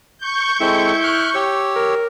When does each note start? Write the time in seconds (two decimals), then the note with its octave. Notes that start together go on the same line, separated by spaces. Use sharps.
0.18 C#6 G6
0.60 G#3 C4 E4 A4
1.04 F6 F#6
1.35 G4 C#5 E6
1.76 A#4